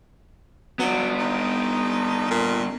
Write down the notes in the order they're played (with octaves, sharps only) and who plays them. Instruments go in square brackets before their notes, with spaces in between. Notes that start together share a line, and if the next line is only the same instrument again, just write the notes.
[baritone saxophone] F#3 [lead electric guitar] B3 D4
[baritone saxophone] D#4
A#2